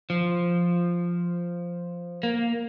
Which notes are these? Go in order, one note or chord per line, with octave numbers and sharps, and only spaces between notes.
F3
A#3